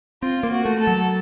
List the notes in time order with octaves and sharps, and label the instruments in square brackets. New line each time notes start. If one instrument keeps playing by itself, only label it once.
[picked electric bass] C4 [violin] F4
[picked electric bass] A#3
[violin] F#4
[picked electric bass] A3
[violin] A4
[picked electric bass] F#3